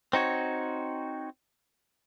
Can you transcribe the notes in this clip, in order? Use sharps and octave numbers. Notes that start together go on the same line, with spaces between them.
C4 D#4 F#4 C#5